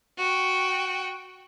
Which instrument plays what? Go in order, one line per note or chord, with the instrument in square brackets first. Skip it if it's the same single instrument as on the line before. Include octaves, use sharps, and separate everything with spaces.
[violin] F#4 G5